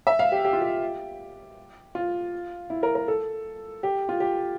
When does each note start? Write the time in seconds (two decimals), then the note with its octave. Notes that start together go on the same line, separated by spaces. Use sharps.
0.07 E5
0.19 F5
0.32 G4
0.45 G4
0.53 F4
0.62 G4
1.95 F4
2.70 E4
2.83 A#4
2.95 A#4
3.08 A4
3.83 G4
4.09 F4
4.20 G4